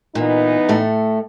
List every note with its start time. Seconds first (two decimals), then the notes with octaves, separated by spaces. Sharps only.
0.15 A#2 E3 B3 D#4
0.69 A2 A3